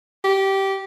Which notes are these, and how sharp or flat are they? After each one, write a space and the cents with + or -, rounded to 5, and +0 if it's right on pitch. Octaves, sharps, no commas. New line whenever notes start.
G4 -15